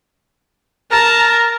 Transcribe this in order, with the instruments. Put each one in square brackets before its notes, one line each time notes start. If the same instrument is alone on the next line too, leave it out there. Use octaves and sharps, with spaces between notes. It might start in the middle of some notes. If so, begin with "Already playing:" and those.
[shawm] A#4 [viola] A5 A#5